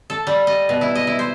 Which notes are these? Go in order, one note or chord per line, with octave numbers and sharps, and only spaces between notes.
A4
G3
D#5
B2
E4
D#5
E4
C5